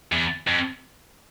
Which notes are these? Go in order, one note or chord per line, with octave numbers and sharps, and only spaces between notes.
E2
F2